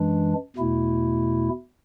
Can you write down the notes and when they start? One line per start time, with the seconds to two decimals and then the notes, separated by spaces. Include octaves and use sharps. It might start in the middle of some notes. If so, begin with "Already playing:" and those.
Already playing: F#2 E3 G#3 D4
0.56 E2 B2 A3 E4